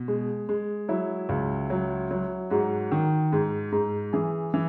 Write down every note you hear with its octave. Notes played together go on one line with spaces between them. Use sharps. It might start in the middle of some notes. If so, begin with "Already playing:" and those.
Already playing: B2
G#3
G#3
F#3 E4
C#2
F#3
F#3
G#2 F#4
D#3
G#2
G#2
E3 G#4
E3